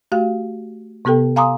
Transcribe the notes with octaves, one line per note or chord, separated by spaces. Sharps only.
A3 F#4 G4 F5
C3 B3 G4 A4 G5
F5 G#5 A#5 C6 D6 D#6